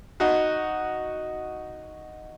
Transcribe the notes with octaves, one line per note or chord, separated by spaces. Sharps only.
D#4 F#4